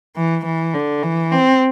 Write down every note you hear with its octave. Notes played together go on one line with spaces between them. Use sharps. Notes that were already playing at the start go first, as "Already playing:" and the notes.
E3
E3
D3
E3
C4